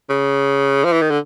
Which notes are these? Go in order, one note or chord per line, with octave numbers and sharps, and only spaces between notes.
C#3
F3
E3
D#3
D3